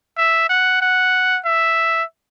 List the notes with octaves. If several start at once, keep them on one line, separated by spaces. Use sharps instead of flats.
E5
F#5
F#5
E5